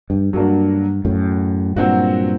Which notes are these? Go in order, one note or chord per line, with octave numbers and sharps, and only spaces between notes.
G2
G2 F#3 A#3 D4 F#4
F#2 A2
G2 A#2 F#3 C4 F#4